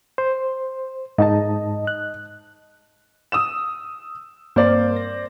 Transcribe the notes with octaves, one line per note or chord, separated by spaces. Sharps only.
C5
G#2 D#4 D#5 A5
F#6
D#6 E6 E7
G2 A#3 C4 C5 D5
A#6